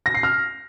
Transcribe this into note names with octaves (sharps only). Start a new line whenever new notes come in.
A#6
C7
F6